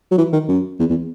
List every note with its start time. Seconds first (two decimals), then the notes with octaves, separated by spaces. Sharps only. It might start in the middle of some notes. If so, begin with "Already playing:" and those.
0.11 F#3
0.18 E3
0.33 D#3
0.49 F#2
0.79 E2
0.89 E2